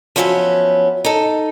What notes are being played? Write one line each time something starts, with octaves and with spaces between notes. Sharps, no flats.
F3 F#3 B3 C#4 D#5 E5
D#4 A4